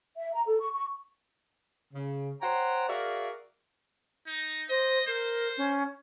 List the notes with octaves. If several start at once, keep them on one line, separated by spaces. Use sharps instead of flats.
E5
A#5
A4
C#6
C#6
C#3
C5 C#5 F#5 G5 A#5
F#4 G#4 A#4 D5 E5 F5
D#4
C5 D#5
A#4 C5
C#4